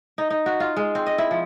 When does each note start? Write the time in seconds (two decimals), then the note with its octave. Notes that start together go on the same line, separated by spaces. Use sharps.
0.18 D#4
0.30 D#4
0.46 F#4
0.60 F4
0.77 G#3
0.95 C4
1.06 D#5
1.18 E4
1.31 F3